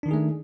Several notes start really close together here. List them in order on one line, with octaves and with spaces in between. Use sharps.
D4 D#3 D#4 G#4 A3